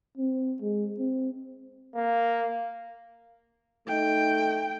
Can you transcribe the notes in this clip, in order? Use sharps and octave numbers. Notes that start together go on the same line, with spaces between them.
C4
G#3
C4
A#3
A3 D#4 G5